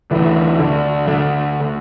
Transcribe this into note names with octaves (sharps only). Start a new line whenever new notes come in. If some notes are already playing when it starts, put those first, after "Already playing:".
D2 D3 E3
D3
D3